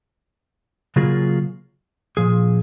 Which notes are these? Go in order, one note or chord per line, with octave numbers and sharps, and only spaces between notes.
C#3 F#3 A#3 F4 G#4
A#2 F3 G#4